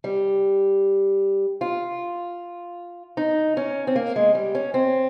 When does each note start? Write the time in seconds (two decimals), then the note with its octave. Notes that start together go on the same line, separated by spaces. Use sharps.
0.04 G3
1.61 F4
3.17 D#4
3.57 C#4
3.87 C4
3.96 A#3
4.16 G#3
4.35 G3
4.55 C#4
4.74 C4